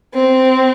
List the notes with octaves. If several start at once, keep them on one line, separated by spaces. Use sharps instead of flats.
C4